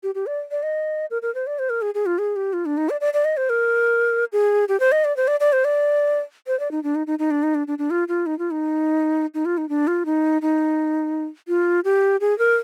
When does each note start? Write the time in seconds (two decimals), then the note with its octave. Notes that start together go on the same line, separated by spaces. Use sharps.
0.03 G4
0.15 G4
0.27 D5
0.51 D5
0.63 D#5
1.11 A#4
1.22 A#4
1.35 C5
1.47 D5
1.59 C5
1.70 A#4
1.82 G#4
1.95 G#4
2.06 F4
2.18 G#4
2.36 G4
2.53 F4
2.66 D4
2.77 D#4
2.90 D5
3.01 D5
3.14 D5
3.25 D#5
3.37 C5
3.50 A#4
4.33 G#4
4.69 G4
4.80 C5
4.92 D#5
5.05 D5
5.17 C5
5.28 D5
5.40 D5
5.53 C5
5.65 D5
6.47 C5
6.60 D5
6.71 D#4
6.83 D4
6.95 D#4
7.07 D#4
7.19 D#4
7.31 D4
7.43 D#4
7.55 D4
7.67 D4
7.79 D4
7.90 F4
8.08 F4
8.26 D#4
8.39 F4
8.51 D#4
9.34 D#4
9.45 F4
9.58 D#4
9.69 D4
9.87 F4
10.06 D#4
10.42 D#4
11.48 F4
11.84 G4
12.21 G#4
12.39 A#4